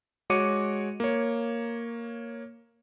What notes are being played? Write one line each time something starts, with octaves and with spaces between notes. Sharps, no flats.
G#3 F#4 C#5 D6 C#7 D#7
A#3 C#5